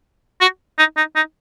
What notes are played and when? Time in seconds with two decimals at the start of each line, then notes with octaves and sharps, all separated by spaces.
0.41 F#4
0.78 D#4
0.97 D#4
1.16 D#4